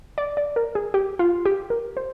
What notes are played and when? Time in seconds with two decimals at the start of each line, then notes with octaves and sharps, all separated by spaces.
0.18 D5
0.37 D5
0.56 A#4
0.75 G#4
0.94 G4
1.19 F4
1.45 G4
1.70 A#4
1.97 C5